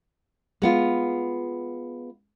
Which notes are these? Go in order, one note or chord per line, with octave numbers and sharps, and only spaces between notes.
G#3 B3 F4